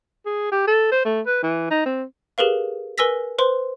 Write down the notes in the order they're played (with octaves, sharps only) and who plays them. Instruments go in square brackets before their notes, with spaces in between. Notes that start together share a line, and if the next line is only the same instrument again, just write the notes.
[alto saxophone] G#4
G4
A4
C5
A3
B4
E3
D#4
C4
[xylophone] G4 G#4 A#4 B4 F5
A#4 B4 G#5 E6 A#6 B6
B4 C5 C6